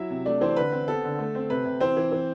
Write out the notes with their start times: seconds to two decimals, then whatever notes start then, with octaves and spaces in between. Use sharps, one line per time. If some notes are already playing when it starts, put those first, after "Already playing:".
Already playing: F#3 E4 E5
0.10 C3
0.25 A3 D4 D5
0.41 E3 C4 C5
0.56 D3 B4
0.72 C4
0.88 B3 A4
1.04 D3
1.19 A3
1.35 C4
1.50 C3 B4
1.65 C3
1.80 E3 C4 C5
1.97 E3
2.12 E3